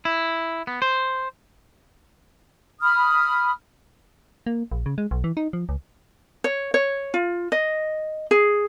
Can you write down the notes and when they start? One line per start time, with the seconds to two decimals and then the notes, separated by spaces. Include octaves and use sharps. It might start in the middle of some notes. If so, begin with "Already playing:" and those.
0.05 E4
0.67 B3
0.82 C5
2.82 B5 D#6 F6
4.46 A#3
4.72 A#1
4.86 C#3
4.98 G#3
5.11 B1
5.24 E3
5.37 D#4
5.53 F3
5.69 C#2
6.44 C#5
6.74 C#5
7.14 F4
7.52 D#5
8.31 G#4